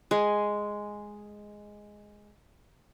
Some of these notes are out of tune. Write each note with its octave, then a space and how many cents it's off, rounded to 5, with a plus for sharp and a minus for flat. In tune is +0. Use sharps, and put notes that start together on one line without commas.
G#3 +0 G#4 +0